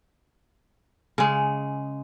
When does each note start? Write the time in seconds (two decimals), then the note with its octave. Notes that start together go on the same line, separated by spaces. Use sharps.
1.18 C#3 G#3